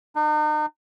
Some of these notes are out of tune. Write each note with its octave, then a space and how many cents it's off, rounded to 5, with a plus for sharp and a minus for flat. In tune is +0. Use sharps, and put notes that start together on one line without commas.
D#4 -40